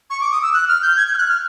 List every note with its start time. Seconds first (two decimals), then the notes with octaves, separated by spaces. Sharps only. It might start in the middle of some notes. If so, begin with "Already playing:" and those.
0.10 C#6
0.21 D6
0.32 D#6
0.42 E6
0.54 F#6
0.68 F6
0.82 G6
0.97 G#6
1.07 G6
1.14 F6
1.18 F#6
1.28 F6